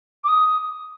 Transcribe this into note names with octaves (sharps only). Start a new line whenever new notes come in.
D6
D#6